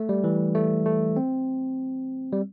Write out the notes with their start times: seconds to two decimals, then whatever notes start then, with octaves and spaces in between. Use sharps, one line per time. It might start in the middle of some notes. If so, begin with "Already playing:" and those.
Already playing: A3
0.09 G3
0.24 E3
0.55 A3
0.86 A3
1.16 C4
2.33 G3